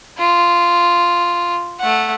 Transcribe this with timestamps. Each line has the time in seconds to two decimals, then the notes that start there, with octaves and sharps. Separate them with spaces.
0.18 F4
1.80 A3 F#5